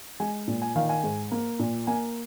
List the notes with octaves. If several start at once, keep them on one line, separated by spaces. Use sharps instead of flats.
G#3 G#5
A#2
G#5
D#3 F5
G#5
G#2
A#3
A#2
A#3 G#5